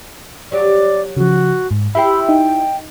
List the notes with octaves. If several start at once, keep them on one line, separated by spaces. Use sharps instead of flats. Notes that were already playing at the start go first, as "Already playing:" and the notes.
F#3 G4 D5
C#3 F3 F#4
G#2
E4 G4 C5 E5 G5 B5
D#4 G5